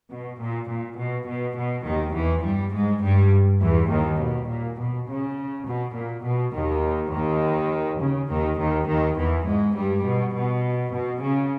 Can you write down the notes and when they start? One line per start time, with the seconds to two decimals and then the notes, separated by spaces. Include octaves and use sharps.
0.10 B2
0.39 A#2
0.69 A#2
0.97 B2
1.27 B2
1.57 B2
1.86 D#2 D#3
2.14 E2 E3
2.44 G2 G3
2.73 G#2 G#3
3.03 G2 G3
3.61 E2 E3
3.91 D#2 D#3
4.20 B2
4.49 A#2
4.78 B2
5.08 C#3
5.66 B2
5.95 A#2
6.24 B2
6.54 D#2 D#3
7.12 D#2 D#3
8.00 C#3
8.30 D#2 D#3
8.59 D#2 D#3
8.88 D#2 D#3
9.17 E2 E3
9.47 G#2 G#3
9.76 G2 G3
10.06 B2
10.35 B2
10.93 B2
11.23 C#3